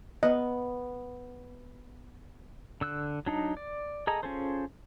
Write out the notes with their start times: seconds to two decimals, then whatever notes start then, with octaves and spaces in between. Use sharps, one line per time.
0.23 B3 D#5
2.81 D3 E6 F#6
3.26 F#3 D4 D#4
3.57 D5
4.07 G#4 A4 D#5 A#5
4.23 C#4 F4 G#4 A4 C5